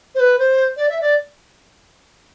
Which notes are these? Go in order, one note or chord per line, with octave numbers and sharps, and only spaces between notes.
C5
B4
C5
D5
E5
D5